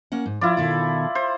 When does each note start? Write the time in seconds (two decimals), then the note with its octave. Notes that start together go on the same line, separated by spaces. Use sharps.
0.12 A#3 C#4 F#5
0.26 G#2
0.41 F3 E4 F4 D5
0.57 B2 D#3 A4
1.15 C5